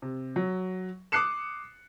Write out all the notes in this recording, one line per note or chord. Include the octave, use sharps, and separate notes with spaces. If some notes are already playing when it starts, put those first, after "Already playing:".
C3
F#3
D6 D#6 F#6 C7 C#7 E7